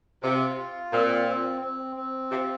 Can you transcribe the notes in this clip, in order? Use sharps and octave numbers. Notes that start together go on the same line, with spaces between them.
C3 F4
F4
A#2 C4
C4
C4
C4
C3 F4